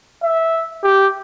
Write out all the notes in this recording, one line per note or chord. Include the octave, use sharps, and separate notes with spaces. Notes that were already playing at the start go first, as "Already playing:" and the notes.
E5
G4